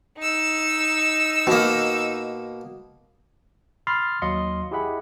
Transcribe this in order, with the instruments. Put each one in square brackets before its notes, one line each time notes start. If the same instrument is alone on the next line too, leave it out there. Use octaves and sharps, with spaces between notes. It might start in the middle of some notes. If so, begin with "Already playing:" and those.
[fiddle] D#4 E6
[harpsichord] B2 A#3
[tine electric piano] B5 C6 D#6 F6 A6 C7
D#2 F#3 D#5 F5 C6 C#7
E4 G4 G#4 D#5 F#5 B5